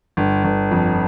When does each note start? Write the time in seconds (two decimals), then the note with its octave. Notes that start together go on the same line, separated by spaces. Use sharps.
0.17 G1
0.44 G1
0.71 F2